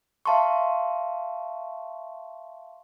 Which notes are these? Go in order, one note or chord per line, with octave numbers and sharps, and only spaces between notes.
E5 F5 A5 C6 C#6